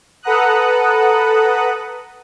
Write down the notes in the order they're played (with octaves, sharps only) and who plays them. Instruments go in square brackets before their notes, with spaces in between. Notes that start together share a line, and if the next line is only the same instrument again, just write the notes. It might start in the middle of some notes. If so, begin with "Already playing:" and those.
[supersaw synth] A4 B4 F#5 A#5 D#6 F#6